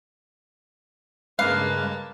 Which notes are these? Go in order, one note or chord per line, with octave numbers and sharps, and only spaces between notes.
G2 C#3 G#3 A#3 B4 F5 A5